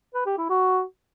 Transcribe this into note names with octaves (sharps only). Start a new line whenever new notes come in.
B4
G4
E4
F#4